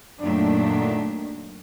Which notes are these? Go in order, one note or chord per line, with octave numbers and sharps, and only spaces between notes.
F#2 A#2 D#3 F#3 A3 D4